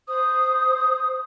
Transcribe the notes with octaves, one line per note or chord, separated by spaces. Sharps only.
C5 D#6